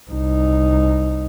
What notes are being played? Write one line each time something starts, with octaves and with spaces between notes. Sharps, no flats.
C2 D#4